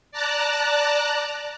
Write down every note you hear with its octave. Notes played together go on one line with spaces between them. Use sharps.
D5 A5 A#5 F#6